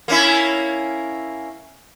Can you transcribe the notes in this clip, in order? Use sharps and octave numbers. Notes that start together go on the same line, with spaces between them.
A#3 C#4 E4